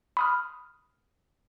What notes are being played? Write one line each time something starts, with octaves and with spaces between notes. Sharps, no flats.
B5 D#6 F6